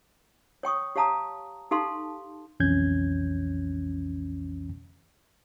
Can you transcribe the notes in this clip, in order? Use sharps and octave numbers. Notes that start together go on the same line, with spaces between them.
C#5 G5 C#6 D#6
G4 C#5 F5 A5 A#5 D#6
D#4 G4 A4 F5 A5 C6
B1 F2 E3 C#4 G6 G#6